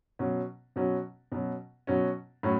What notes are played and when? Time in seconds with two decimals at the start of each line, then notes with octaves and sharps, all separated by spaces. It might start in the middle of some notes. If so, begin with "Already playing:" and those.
0.19 B2 F#3 C#4
0.76 B2 F#3 C#4
1.32 B2 F#3 C#4
1.87 B2 F#3 C#4
2.43 A2 F#3 C#4